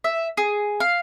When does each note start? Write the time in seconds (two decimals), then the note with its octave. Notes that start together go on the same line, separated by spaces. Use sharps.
0.04 E5
0.37 G#4
0.80 F5